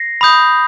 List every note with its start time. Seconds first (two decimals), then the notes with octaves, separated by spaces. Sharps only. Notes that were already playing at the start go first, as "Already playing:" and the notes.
Already playing: A#6 C7
0.21 B5 D#6 G6